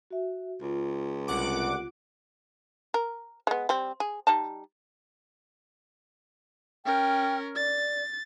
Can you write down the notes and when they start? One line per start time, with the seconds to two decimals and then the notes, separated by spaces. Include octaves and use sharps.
0.10 F#4 E5
0.61 C#2 F4
1.28 C2 F#5 D6
2.94 A#4
3.47 G#3 B3
3.69 G3 C4
4.00 G#4
4.27 G3 D#4 A5
6.85 C#4 A#4 G5
7.56 D5 A6